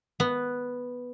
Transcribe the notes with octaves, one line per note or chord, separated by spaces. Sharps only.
B3